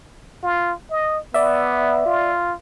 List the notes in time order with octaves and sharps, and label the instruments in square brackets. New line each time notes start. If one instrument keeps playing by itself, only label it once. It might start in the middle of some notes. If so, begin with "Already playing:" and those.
[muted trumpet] F4
D#5
[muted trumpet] B3 [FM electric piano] D5 E5
[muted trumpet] F4